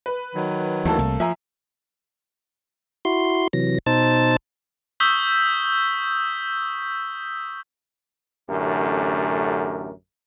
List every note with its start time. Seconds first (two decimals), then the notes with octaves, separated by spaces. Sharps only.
0.06 B4
0.35 D#3 F#3
0.85 D2 E3 A3 A#3 A4
0.99 C2
1.20 F3 E5 G#5 A#5
3.05 E4 F#4 C6
3.53 C3 E3 F#3 A#6
3.86 B2 D#4 C5 A5 E6 A6
5.00 C#6 D#6 E6 G6 B6 G7
8.49 A1 F#2 D3 A3 G4 A#4